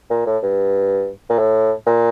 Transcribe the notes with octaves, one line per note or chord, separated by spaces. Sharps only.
A#2
A2
G2
A#2
A2
A#2